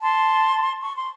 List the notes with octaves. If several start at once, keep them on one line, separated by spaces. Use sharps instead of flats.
A5 C6
C#6
C6